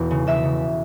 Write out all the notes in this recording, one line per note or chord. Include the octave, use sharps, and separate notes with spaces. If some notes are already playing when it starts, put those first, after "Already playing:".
Already playing: E1 E2
C#3
E1 E5
C#3